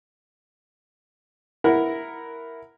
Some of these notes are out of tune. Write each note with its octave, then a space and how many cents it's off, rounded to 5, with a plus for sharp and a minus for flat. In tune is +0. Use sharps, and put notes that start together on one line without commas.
E4 +0 A#4 +0 F#5 +0